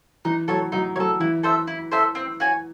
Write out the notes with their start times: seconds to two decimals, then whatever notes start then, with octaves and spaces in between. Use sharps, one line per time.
0.25 E3 D#4
0.48 F#3 A4 C#5
0.72 F#3 D#4
0.96 F#3 C#5
1.00 A4
1.20 E3 E4
1.43 A4 C5 E5
1.67 E4
1.91 A4 C5 E5
2.15 C4
2.40 F#4 C#5 G#5